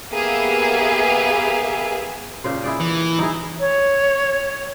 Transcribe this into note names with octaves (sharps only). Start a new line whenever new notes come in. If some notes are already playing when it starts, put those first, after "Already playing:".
A#3 B3 G4 G#4 E5 F5
A#2 C#3 C5
E4 G#4 D5
E3
D#4 E4 G#4
C#5